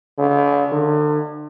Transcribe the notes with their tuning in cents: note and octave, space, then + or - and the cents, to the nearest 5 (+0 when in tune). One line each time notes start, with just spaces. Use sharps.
D3 -45
D3 +35